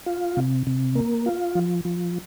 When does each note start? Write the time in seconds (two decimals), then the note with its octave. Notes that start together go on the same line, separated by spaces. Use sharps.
0.06 F4
0.37 C3
0.67 C3
0.95 A#3
1.26 F4
1.55 F3
1.85 F3